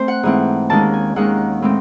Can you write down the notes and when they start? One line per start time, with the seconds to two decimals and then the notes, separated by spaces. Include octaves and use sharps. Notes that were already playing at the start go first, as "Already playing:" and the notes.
Already playing: A3 C4 C5
0.08 F#5
0.23 G#2 E3 A3 C4
0.70 D#2 D#3 G#3 C#4 A5
0.94 G#5
1.16 D#2 D#3 G#3 C#4 F#5
1.62 A2 G#3 C4